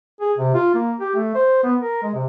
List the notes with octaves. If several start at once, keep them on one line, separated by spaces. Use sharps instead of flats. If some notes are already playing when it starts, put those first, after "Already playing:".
G#4
C3
F4
A#3
G4
A3
C5
B3
A#4
G#3
C3